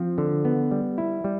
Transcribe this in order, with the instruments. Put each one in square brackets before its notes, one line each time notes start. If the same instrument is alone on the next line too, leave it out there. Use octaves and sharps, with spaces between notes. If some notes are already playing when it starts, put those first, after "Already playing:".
Already playing: [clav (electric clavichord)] F3 C4
D3
B3
G3
E4
G3